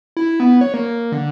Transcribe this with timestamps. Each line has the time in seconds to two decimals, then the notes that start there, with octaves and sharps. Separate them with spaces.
0.17 E4
0.40 B3
0.61 C#5
0.74 A#3
1.12 D3